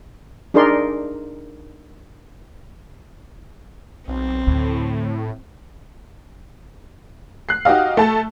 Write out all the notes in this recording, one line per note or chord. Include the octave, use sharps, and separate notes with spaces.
D4 D#4 G#4 A#4 D5 C6
B1 C4
D2 A2
F#6 C7
D#4 F#4 G4 D#5 F5
A3 A5